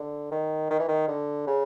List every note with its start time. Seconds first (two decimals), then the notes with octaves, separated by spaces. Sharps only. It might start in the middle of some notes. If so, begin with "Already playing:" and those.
Already playing: D3
0.31 D#3
0.70 D#3
0.79 E3
0.88 D#3
1.08 D3
1.47 C#3